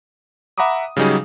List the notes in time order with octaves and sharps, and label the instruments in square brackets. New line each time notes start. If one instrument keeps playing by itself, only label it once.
[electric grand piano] E5 F#5 A#5 B5 D6 D#6
C#3 F#3 G3 D#4 G#4